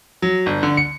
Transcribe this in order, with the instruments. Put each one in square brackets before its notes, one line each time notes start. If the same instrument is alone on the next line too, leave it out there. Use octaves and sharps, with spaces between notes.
[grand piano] F#3
G1
D3
C#7